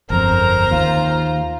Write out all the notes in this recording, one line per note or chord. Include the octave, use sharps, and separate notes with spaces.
G1 F2 A#4 C5 A#5
D#2 F4